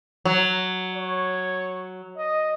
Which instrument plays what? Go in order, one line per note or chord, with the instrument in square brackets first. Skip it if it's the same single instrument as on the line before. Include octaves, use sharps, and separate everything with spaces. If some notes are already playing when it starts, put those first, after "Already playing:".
[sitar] F#3
[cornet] C#5
D#5